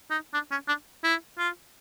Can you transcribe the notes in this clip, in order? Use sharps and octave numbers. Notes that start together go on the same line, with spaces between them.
D#4
D4
C#4
D4
E4
F4